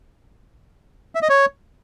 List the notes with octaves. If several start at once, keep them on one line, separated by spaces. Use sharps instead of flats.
E5
D#5
C#5